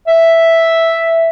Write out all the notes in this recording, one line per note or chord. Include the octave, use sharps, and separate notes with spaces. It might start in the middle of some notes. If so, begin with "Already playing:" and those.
E5